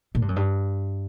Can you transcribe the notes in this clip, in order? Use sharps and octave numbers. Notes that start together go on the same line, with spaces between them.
A#2
G2
F#2
G2